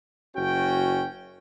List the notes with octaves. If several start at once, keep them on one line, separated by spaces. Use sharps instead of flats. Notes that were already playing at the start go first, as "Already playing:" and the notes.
F#1 C#4 F#4 G5